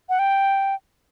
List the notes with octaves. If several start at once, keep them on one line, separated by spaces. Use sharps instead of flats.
F#5
G5